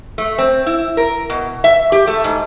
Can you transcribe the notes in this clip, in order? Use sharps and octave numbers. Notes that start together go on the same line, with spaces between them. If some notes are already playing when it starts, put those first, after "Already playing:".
A3
C4
E4
A#4
B2
E5
G4
A3
G#2